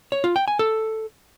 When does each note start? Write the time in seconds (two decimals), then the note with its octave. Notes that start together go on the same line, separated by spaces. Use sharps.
0.12 C#5
0.24 F4
0.36 G5
0.48 G#5
0.59 A4